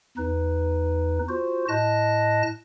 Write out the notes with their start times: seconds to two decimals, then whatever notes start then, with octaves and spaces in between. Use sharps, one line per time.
0.18 E2 D#4 B4
1.29 F4 F#4 C5
1.69 A2 D#5 A5 F#6 A#6